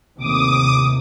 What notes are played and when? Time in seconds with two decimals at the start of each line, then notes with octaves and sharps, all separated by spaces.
0.18 D#2 A2 C3 D6 D#6